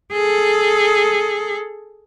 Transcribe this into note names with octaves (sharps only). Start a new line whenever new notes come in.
G#4 A4